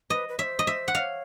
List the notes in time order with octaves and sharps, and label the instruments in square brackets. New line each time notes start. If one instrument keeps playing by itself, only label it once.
[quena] B4 [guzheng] D#5
[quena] B4
[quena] C5 C#5 [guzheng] E5
[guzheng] D#5
[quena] C5 [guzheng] E5
[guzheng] F#5
[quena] D#5 [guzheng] F5
[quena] C#5